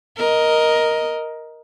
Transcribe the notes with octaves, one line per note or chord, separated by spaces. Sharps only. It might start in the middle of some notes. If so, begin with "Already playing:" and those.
A#4 D#5